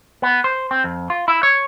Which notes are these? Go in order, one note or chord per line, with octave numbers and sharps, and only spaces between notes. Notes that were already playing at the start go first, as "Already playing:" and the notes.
B3
C5
C4
F2
F4
E4
C#5